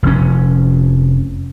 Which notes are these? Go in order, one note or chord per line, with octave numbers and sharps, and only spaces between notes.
F1 F3 C#4